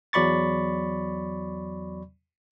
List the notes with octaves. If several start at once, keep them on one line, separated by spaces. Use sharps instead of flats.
E2 F#3 D5 B5 C#6 A6